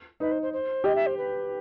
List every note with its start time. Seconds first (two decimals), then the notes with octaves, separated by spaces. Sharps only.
0.20 D#4 B4
0.31 C5
0.42 C5
0.53 C5
0.84 G4 D#5
0.95 E5
1.06 C5
1.17 B4